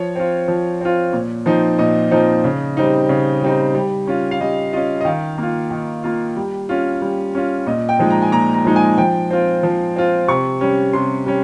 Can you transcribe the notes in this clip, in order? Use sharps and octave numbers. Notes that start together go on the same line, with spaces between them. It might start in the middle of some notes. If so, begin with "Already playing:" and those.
Already playing: F3 C#5
C4 F4
F3
C4 F4
A#2
F3 C4 D#4
A#2 D#5
F3 C4 D#4
C#3
G3 C4 D#4
C#3
G3 C4 D#4
G3
C#4 F4
F5
G3 D#5
C#4 F4 D#5
D#5
D#3 F5
A#3 F4
D#3
A#3 F4
G3
C#4 F4
G3
C#4 F4
A#2 D#5
G5
F3 G#3 D#4
A#5
G#5
A#2 A#5
A#5
F3 G#3 D#4
G#5
F3 G5
C4 F4
F3
C4 F4
C3 C#6
G3 C#4
C3 C6
G3 C#4